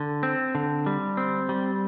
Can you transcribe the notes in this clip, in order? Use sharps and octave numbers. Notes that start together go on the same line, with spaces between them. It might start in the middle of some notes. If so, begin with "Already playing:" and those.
Already playing: D3
C4
D3
G3
C4
G3